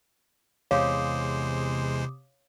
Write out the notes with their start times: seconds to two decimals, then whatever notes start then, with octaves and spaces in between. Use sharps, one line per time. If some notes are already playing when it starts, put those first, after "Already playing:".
0.71 E2 C3 G#3 C5 C#5 F5 D6 D#6